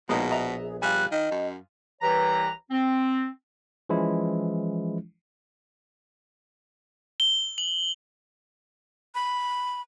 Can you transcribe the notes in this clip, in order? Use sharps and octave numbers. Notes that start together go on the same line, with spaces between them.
A#1 B2 G#3 A#3 B3 D#4
D#5 E5 A#5
G#4
G3 F4 G#5 F#6
D#3 D#5
F#2
C2 E3 G4 B4 C#5 A#5
C4
E3 F3 G#3 C#4 E4
G7
F#7
B5